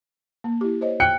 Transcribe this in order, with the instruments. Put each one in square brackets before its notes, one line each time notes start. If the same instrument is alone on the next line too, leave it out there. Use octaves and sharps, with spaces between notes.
[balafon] A#3
E4 G4
C5 C#5 D#5
[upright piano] G5 F#6 C#7